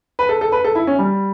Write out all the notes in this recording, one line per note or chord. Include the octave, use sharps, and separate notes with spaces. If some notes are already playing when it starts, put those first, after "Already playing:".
B4
A4
A4
B4
A4
E4
C#4
G3